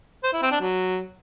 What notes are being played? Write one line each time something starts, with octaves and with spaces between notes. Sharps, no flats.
C5
E4
C4
D4
F#3